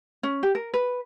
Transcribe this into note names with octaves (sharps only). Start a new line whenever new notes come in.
C#4
G4
A#4
B4